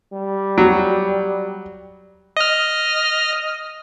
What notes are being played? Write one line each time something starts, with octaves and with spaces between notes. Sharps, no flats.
G3
F#3
D#5 F6